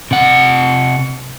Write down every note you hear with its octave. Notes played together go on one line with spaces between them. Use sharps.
C3 F#5